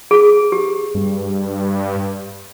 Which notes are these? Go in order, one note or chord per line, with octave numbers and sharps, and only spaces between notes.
G#4
G4
G2